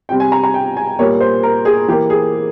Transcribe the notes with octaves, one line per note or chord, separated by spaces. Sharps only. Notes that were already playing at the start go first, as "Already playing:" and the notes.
C3 G3 C4 G5
G#5
A#5
A#5
G5
G#5
A#2 G3 A#3 C#5
C5
A#4
G#4
E3 A#3 G4
G#4